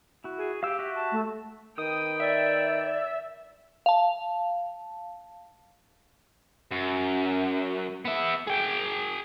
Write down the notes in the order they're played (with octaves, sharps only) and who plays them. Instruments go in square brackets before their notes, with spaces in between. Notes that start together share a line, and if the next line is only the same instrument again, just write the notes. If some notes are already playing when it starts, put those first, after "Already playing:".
[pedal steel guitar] E4 F#4
[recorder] G#4
[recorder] G4 [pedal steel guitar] F5 E6
[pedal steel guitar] F#4 E5
[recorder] A5
[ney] A3
[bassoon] D#3 [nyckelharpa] B4 G5 [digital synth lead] D#6
[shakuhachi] D5 [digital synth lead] E5
[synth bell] F5 A5
[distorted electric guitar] F#2
B3 E5
G#4 G5